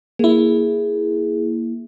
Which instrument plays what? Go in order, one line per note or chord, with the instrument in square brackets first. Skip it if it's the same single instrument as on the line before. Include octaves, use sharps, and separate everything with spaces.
[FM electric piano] A#3 E4 [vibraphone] G#4